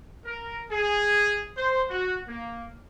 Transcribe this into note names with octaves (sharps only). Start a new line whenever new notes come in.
A#4
G#4
C5
F#4
A#3